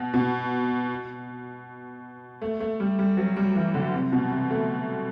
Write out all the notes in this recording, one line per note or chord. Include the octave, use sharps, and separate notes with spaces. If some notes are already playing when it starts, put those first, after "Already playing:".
Already playing: B2
B2
A3
A3
G3
G3
F#3
G3
E3
D3
C3
B2
C3
A3